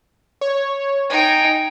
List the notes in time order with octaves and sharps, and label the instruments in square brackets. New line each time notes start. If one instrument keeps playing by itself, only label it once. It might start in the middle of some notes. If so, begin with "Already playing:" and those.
[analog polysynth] C#5
[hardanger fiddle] D#4 G5 [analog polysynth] G#5